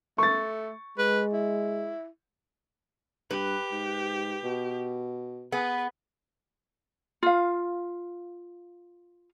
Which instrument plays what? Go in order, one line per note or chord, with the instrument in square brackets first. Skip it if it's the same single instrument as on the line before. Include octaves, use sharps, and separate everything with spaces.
[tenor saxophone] A3 [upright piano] C#6 A6
[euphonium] G#3 [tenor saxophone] B4
[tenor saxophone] E4
[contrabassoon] G2 [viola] G4 [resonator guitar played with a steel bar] B4
[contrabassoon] G#2
B2
[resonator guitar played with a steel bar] B3 G#4 [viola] B4
[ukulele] F4 F5